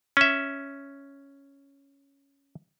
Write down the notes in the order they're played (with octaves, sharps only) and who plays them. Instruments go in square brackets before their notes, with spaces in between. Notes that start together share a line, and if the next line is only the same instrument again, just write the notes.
[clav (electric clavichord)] C#4 E5